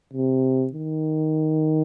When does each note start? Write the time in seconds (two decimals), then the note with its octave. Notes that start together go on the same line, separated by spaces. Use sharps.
0.14 C3
0.73 D#3